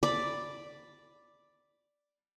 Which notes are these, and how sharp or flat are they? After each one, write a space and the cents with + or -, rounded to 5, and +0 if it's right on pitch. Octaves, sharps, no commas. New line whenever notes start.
D5 +0 B5 +0